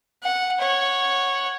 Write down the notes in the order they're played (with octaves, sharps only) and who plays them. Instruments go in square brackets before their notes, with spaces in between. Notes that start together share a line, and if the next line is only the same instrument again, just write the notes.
[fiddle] F#5
C#5 F#5